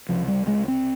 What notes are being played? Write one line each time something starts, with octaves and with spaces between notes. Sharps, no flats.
C#2 C3 F3
G3
G#3
C4